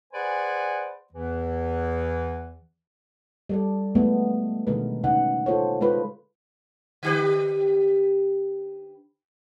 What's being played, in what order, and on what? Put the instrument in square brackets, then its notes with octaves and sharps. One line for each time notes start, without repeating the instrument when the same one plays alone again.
[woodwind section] G#4 B4 C5 D5 F#5 G#5
E2 E3
[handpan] G3 A4 D5
E3 G#3 A3 B3
B2 D3 D#3 G#3 A#4 B4
C#3 D#4 F#5
F4 A4 C5 C#5
G#3 F4 B4
[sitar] D3 G4 B4